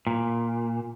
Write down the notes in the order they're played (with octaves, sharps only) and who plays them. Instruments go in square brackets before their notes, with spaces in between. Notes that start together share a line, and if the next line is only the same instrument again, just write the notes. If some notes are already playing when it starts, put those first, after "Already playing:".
[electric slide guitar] A#2